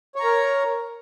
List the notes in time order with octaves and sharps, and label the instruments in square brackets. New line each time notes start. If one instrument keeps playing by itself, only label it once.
[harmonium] C#5
A#5
A#4